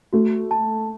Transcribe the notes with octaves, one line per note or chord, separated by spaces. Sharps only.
A3 F#4
A5